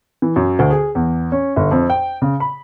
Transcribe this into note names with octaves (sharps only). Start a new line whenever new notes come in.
E3
F#2
D2
G#4
E2
C#4
G1
F2
G5
C#3
B5